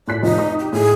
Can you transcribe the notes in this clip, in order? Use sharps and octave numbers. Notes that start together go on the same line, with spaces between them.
A2 D5 F#6 B6
F1 D#4 F4 D#5
D#6
G4
A2 G#4